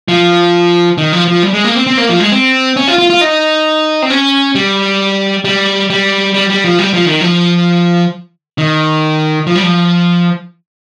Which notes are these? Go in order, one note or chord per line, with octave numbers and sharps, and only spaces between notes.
F3
D#3
F3
F3
G3
G#3
A#3
C4
C4
A#3
F3
G#3
C4
C#4
F4
F4
F4
D#4
C4
C#4
G3
G3
G3
G3
G3
F3
G3
F3
D#3
F3
D#3
F3
G3
F3